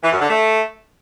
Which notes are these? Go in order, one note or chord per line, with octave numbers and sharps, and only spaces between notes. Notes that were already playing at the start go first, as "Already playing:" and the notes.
E3
F#2
D3
A3